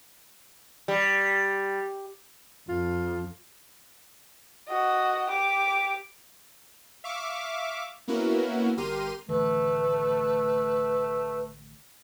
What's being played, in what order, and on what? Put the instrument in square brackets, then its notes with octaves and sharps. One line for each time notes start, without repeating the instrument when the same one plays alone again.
[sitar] G3
[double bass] F2 [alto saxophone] F4
[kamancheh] F#4 D#5
G4 D6
[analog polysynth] E5 F5 C#6 D6
A#3 B3 C#4 E4 F#4 A#4
G1 G4 A#4 C6 F6 D#7
[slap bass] A1 D3 D#3 [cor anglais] A3 [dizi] B4